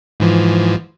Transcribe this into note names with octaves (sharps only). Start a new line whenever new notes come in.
G#2 E3 F3